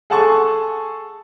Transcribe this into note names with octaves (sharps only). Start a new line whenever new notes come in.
G#4 A4 F#5 A5 C6 C#6